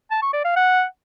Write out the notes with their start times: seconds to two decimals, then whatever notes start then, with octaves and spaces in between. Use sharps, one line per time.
0.11 A5
0.22 C#6
0.34 D5
0.45 F5
0.56 F#5